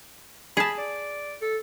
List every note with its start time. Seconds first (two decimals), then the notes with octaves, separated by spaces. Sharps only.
0.57 G#4 A5 B5
0.78 D5
1.42 A4